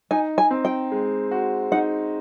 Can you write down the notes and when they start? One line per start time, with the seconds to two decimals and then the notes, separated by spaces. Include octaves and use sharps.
0.11 D#4 G#5
0.38 G#5
0.51 C4
0.65 G5
0.92 G#3
1.31 F#4
1.72 D#4 F#5